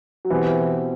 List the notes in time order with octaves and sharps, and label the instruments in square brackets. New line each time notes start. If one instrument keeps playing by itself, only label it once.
[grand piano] F#3
[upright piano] B2 G3 C4 E4 [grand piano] E3